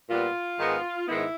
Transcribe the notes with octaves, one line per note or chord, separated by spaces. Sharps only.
A#2 G3 B3 F4
G#2 D#3 G#3 B3
G#2 D#3 G#3 B3 E4